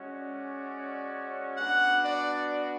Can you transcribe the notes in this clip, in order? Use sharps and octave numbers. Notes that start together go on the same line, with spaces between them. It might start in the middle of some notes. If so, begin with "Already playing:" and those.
Already playing: G#3 C#4 F#4
D5
B3 D4 F#4 F#5
D5